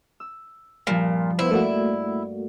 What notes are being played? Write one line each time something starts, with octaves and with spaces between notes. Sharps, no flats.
E6
G2 A#2 F3
B3 E4 C5
A3 A#3 F#4 D5 E5